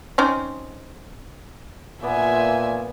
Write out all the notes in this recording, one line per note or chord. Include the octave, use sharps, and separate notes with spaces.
C4 C#4 D#4
A#2 B3 D5 E5 G#5